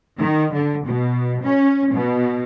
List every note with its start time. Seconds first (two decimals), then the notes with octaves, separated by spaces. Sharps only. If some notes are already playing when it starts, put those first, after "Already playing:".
0.18 D#3
0.53 D3
0.86 B2
1.43 C#4
1.93 B2